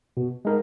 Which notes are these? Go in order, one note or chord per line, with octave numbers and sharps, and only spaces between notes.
B2
G#3 D#4 A#4